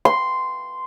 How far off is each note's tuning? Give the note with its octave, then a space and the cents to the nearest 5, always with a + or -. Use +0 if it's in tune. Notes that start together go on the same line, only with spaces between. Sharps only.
C6 -10